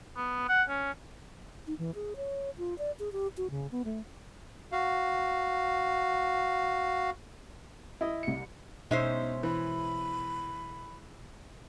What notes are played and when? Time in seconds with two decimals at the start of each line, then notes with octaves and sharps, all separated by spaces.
0.16 B3
0.49 F#5
0.69 C#4
1.67 D#4
1.79 E3
1.95 G#4
2.16 C#5
2.58 F4
2.78 D5
2.99 G#4
3.13 G4
3.37 F#4
3.50 C#3
3.72 B3
3.85 A3
4.72 F#4 F5
8.01 E4 D#5
8.23 C2 C#7
8.91 B2 G#3 C#4 D#4 C5 E5
9.43 E3 B5